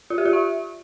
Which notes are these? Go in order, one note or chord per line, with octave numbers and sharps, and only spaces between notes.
F4
G4
F4
E5